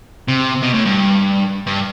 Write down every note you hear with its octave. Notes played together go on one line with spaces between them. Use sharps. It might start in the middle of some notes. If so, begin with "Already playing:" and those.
C3
B2
A2
G2
G2